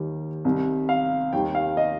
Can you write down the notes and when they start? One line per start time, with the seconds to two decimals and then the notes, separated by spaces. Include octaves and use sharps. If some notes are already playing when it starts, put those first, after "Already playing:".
Already playing: D#2 D#3 G3
0.45 C2 C3 D#3 G3
0.89 F5
1.33 D#2 D#3 G3 G5
1.55 F5
1.77 D#5